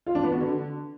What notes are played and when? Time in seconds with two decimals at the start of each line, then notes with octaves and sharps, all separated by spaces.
0.07 F4
0.15 D4
0.23 B3
0.32 F#4
0.40 D3